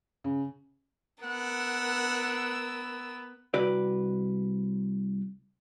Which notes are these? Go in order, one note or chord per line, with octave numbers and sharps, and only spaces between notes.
C#3
B3 A#4 F#5 E6
C2 F#4 B4 D5